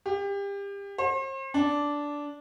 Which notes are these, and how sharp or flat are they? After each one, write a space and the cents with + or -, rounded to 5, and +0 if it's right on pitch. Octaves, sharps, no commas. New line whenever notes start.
G4 +30
C5 +40
D4 -10